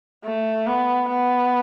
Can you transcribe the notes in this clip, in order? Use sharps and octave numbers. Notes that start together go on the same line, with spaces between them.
A3
B3
B3